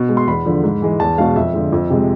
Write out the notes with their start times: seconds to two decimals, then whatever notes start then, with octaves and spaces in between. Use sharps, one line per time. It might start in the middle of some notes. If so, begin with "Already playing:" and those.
Already playing: B2
0.09 G#3
0.17 C6
0.27 E2 B5
0.45 D3 F3
0.64 G#2
0.82 E3 G#3
1.00 E2 A5
1.18 B2 G#3 F5
1.36 F2 E5
1.54 D3 F3 G#3
1.72 F2
1.90 C3 G#3